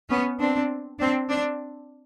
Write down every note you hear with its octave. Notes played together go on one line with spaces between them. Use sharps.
B3 C#4
C4 D4
C4 D4
C4 D4